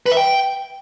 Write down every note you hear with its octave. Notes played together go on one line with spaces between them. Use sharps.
B4
E5
G5